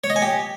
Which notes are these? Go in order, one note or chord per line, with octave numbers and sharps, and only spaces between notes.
C#5
D#5
G#5
G4